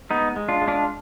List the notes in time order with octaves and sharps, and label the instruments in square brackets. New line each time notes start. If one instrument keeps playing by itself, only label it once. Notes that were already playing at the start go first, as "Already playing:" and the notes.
[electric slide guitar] G#3 B3 D#4
G#3
D4 F4
G#3
D4 F4